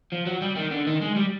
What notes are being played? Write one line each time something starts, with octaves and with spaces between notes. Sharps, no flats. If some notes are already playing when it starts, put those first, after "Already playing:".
F3
F#3
G3
D#3
D3
D#3
G#3
G3